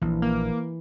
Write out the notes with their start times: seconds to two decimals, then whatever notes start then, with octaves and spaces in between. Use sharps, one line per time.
0.02 A#1 E3
0.22 A#3